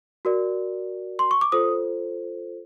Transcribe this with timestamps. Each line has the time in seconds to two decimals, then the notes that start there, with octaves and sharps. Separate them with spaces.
0.25 F#4 A#4 D5
1.19 C6
1.31 C#6
1.41 D6
1.52 F4 A4 C5 D#6